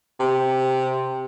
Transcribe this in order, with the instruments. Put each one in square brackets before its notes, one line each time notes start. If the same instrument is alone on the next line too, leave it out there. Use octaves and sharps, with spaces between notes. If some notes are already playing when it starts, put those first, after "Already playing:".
[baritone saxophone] C3